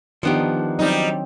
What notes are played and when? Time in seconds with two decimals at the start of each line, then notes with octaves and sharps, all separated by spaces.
0.23 D#3 F3 B3 D4 D#4 G4
0.79 F#3 G3 C4 D#4